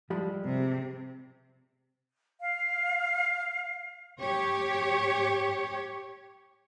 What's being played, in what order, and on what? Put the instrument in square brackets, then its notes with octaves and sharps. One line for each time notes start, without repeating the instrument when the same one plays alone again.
[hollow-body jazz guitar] F3 G3 G#3
[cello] C3
[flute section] F5
[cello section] G4 C#5